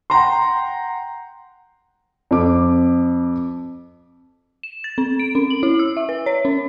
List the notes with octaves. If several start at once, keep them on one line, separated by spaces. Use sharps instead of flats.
F#5 G5 A#5 C6
F2 D6
E7
A6
C4
D7
C#4
F#7
E4
E6
E5
B4
C#5
C#4